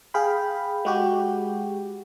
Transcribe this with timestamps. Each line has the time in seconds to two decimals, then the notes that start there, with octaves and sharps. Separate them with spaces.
0.14 G#4 F5 G5 B5
0.85 G#3 F#4 G4